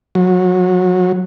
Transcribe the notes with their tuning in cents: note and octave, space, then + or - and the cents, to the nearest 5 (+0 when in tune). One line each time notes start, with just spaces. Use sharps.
F#3 -25